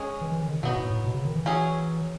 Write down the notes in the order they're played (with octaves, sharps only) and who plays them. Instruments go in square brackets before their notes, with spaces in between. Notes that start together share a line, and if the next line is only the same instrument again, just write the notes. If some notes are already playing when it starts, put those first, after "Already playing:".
Already playing: [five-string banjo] G#3 C#4 G#4
[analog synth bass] E3
E3
D#3
C#3
D#3
[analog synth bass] B2 [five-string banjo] F#3 B3 D#4
[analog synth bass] A2
A2
B2
C#3
D#3
E3
[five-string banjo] F#3 C#4 G#4